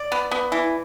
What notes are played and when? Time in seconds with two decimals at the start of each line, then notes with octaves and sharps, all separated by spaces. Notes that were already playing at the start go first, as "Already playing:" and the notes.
Already playing: D5
0.12 B3
0.31 B3
0.52 E3